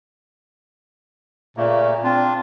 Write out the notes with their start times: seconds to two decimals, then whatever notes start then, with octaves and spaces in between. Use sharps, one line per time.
1.57 A#2 C#3 A3 A#3
2.04 C4 D4 F4